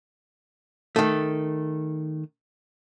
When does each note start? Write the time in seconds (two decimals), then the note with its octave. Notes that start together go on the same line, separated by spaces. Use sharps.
0.96 D#3 A3